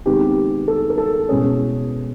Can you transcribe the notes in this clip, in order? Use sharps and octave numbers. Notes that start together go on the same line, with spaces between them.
C3 D#3 G#3 B3 G4
A4
A#4
A4
E2 B2 G#3 C#4 G#4